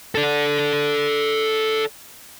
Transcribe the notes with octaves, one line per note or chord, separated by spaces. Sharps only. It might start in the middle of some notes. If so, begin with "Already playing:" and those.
A4 D5